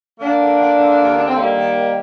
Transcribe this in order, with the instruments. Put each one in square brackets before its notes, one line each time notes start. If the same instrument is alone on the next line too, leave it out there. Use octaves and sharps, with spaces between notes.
[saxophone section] D3 A#3 D4
D3
D3
D3
D#2
D3 D4
C4
D#3 G3 A#3
D#3
D#3